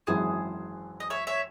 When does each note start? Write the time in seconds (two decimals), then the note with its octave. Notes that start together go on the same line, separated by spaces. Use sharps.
0.07 G#1 F#2 E3 G#4 C5
1.00 D#5
1.10 C#5 E5
1.27 C#5 E5